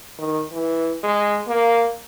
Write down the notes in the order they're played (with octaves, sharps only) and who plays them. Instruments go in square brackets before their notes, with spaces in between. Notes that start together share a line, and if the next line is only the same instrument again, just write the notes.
[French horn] D#3
E3
G#3
A#3